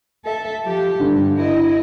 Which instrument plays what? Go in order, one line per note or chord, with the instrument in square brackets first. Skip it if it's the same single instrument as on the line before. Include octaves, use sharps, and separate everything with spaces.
[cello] A4 E5
F3 G4
[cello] G2 [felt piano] D3
[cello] E4 D#5